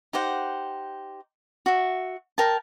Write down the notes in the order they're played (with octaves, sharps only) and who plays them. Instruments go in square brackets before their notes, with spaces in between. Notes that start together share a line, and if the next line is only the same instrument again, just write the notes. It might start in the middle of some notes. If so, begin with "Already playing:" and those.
[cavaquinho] D#4 G4 C5 F#5
F#4 E5
A#4 G5 A5